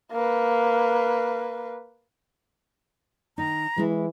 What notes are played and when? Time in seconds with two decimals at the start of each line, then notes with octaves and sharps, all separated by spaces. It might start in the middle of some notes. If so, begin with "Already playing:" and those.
0.12 A#3 B4
3.38 D#3 D#4 A#5
3.78 E3 G#3 E4